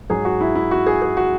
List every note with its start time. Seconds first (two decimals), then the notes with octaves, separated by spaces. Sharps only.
0.09 G#2 F#3 G#4
0.25 F#4
0.41 E4
0.55 E4
0.71 F#4
0.86 G#4
1.02 G#4
1.17 F#4